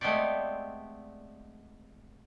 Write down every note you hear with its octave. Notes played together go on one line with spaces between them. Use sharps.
G#3 A3 B3 C4 G4 D5